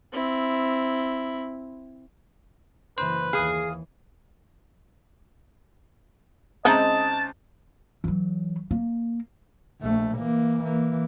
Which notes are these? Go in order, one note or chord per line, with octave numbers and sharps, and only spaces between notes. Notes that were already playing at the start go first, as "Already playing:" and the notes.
C4 E4
F#1 E3 B4 C5
D#2 E3 G#4 F5 D#6
C#2 G#3 C4 D#4 E4 D#5 A5 A#5
E3 F#3
A#3
A#1 A3
E3 A#3
E3 A#3